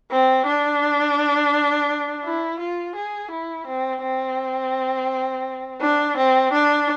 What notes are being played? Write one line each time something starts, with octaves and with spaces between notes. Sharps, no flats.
C4
D4
E4
F4
G#4
E4
C4
C4
D4
C4
D4